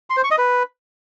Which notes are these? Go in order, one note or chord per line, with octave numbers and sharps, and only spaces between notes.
C6
C5
C#6
D#5
B4